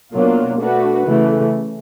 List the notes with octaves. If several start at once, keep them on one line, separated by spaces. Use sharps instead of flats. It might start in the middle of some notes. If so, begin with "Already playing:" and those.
B2 F#3 A#3 D4 F4
A3 D4 F#4 B4
C#3 E3 A3